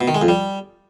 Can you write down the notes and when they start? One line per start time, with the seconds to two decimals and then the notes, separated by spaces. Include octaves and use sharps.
0.01 B2
0.08 D#3
0.15 G#3
0.21 F2
0.28 G3